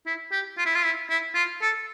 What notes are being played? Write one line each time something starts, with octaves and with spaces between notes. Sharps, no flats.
E4
G4
F4
E4
F4
E4
E4
F4
A4